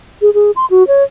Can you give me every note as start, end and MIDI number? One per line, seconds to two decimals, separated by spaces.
0.22 0.33 68
0.34 0.51 68
0.56 0.66 84
0.70 0.86 66
0.88 1.03 73